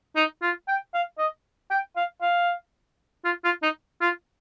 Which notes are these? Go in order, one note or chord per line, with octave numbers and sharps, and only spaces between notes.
D#4
F4
G5
F5
D#5
G5
F5
F5
F4
F4
D#4
F4